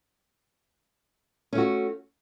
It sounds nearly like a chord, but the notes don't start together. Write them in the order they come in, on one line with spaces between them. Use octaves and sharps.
C#4 A3 F#4